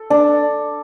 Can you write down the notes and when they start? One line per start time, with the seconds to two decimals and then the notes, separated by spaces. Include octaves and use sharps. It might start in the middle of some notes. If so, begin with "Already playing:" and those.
Already playing: A4
0.10 D4